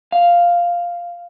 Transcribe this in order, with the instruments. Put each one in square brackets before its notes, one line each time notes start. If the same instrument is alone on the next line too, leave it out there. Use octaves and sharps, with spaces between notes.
[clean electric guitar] F5